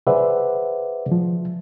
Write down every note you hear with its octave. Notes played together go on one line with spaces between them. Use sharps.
G#4 B4 C5 D5 E5 F#5
F3